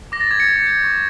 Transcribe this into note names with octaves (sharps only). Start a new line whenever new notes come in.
D6 A#6
A6
D6 G#6
C#7
G6
G6
C#6